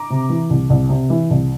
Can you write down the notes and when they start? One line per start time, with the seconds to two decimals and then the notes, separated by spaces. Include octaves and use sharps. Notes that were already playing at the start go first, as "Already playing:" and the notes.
Already playing: A#5 D6
0.10 C3
0.30 E3
0.50 C2
0.70 C2
0.89 C3
1.10 E3
1.30 C2